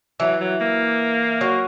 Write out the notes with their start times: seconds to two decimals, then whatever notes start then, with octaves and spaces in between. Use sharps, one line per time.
0.20 E3 F#3
0.41 F#3
0.61 A#3
1.41 F#3